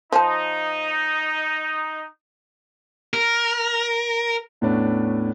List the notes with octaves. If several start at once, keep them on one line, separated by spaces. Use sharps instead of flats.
F3 D#4 A5
A#4
E2 A2 A3 B3 C#4 D4